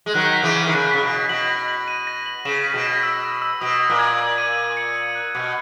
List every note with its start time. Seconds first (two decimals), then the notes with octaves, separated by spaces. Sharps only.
0.06 G#3
0.14 D#3 F#3 F#6
0.33 B6
0.43 C#3 E3
0.53 B6
0.66 D#3
0.72 C#3 F#6
0.91 C#3 B6
1.01 B2
1.10 F#6
1.29 B2 F#7
1.49 A#6
1.68 F#7
1.88 D#7
2.07 A#6
2.26 F#7
2.45 C#3 E7
2.64 B6
2.74 B2
2.83 E7
3.03 E6
3.23 E6
3.42 E6
3.61 B2 D#6
3.80 D#6
3.90 A#2
3.99 G#6
4.18 D#6
4.38 D#7
4.56 D#6
4.77 C#7
4.95 C#7
5.15 F#6
5.35 B2 F#6